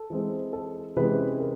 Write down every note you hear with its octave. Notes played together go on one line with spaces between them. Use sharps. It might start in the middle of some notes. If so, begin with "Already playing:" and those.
Already playing: A4
E3 G#3 C4
A4
C3 E3 G#3 C#4 B4
A#4